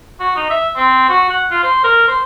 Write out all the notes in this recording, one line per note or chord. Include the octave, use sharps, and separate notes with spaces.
F#4
D#4
E5
C4
F#4
F#5
F4
C5
A#4
C5